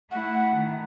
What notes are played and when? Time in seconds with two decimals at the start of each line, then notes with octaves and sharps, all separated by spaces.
0.11 A3 E4 F#5
0.55 D#3 A3